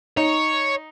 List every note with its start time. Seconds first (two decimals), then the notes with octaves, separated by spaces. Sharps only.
0.17 D#4 C#5